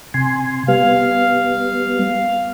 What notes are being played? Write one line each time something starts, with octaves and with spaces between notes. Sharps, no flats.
C3 G#5 C6
G3 B3 F5